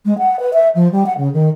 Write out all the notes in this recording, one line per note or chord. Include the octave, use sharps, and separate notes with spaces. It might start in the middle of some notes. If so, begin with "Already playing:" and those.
G#3
F#5
B4
E5
F3
G3
F#5
C#3
D#3